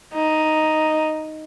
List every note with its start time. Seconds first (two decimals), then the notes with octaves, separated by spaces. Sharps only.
0.15 D#4